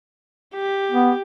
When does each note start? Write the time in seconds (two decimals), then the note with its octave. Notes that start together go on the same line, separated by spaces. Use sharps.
0.55 G4
0.92 B3